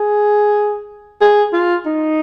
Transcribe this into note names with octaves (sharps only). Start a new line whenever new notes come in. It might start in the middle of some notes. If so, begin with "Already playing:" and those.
Already playing: G#4
G#4
F4
D#4